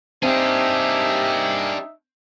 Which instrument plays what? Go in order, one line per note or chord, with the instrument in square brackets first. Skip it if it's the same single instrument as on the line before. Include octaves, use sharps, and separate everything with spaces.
[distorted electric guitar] A#3 G#4 [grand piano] C4 [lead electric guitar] D4 G4 [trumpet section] D#4 E5